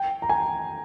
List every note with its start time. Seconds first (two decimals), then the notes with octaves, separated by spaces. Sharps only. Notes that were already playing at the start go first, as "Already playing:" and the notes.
Already playing: G5
0.22 A#5
0.29 G#5